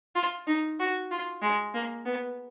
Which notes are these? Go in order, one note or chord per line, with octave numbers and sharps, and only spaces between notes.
F4
D#4
F#4
F4
G#3
A#3
B3